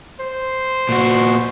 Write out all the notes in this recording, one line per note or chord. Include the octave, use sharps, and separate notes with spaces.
C5
A#2 F#4